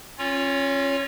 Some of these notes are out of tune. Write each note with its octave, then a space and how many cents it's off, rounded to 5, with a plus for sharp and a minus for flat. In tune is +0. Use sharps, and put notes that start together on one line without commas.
C#4 -25 F4 +0 C#5 +15